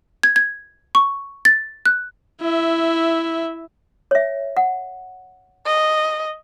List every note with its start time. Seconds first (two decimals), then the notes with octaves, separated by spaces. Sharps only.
0.23 G#6
0.36 G#6
0.95 C#6
1.45 A6
1.86 F#6
2.41 E4 E5
4.11 C#5 E5
4.57 F#5
5.66 D#5